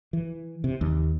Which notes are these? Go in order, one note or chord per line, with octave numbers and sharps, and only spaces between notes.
E3
C3
D#2